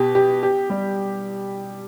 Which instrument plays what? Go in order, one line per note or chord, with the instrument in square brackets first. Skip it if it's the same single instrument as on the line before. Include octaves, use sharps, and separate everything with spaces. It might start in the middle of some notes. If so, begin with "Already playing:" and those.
Already playing: [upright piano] B2 G4
G4
G4
G3